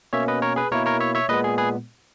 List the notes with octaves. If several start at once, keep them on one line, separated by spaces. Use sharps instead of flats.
B2 A#3 C#4 C#5 E5
B4 D#5
A#4 C#5
G#4 B4
B2 A#3 E4 A#4 C#5
A#4 C#5
C#5 E5
C#5 E5
A#2 G#3 B3 B4 D#5
G#4
G#4 B4